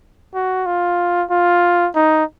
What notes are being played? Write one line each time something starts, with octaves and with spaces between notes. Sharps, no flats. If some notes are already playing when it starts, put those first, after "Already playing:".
F#4
F4
F4
D#4